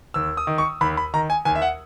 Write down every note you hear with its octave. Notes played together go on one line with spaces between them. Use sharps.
D#2 E6
D#6
D#3
C#6
D#2 B5
B5
D#3 A#5
G#5
D#2 G#5
E5
F#5